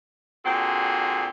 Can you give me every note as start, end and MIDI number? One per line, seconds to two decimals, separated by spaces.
0.45 1.26 46
0.45 1.26 50
0.45 1.26 60
0.45 1.26 66
0.45 1.26 68